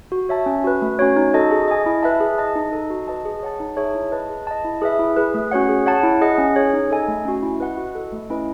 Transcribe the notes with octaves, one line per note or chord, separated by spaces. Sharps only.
F#4
C#5 E5 A5
C#4
F#4 B4
A3
C#4 F#4 C#5
D#4
F#4 A4 D#5 A5
G#4
D#5 G#5
E4
B4 E5 A5
G#4
D#5 A5
D#4
A4 D#5
F#4
B4 D#5 A5
G#4
C#5 F#5 A5
D#4
G#4 C#5 E5 A5
E4
B4 D#5 A5
G#4
D#5 A5
E4
G#4 B4 E5
E4
G#4 B4
A3
C#4 F#4 C#5 F#5
G#4
C#5 F#5 A5
E4
G#4 D#5 F#5
C#4
G#4 C#5
D#4
A4 D#5 G#5
A3
C#4 F#4
E4
B4 D#5 F#5
F#4
A4 D#5
A3
C#4 E4 B4 D#5